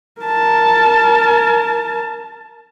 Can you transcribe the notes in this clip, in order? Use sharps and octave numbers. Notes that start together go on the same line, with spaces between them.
A#4 A5